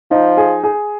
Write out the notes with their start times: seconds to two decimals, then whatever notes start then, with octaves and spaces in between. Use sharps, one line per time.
0.11 F3 D#4
0.37 G#4
0.64 G#4